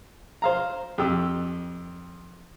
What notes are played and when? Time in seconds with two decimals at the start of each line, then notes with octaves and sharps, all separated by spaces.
0.42 C5 F5 A#5
0.98 F2 G4 E6